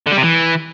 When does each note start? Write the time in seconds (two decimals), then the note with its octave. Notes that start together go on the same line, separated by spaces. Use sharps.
0.06 D3
0.12 G3
0.17 C3
0.22 E3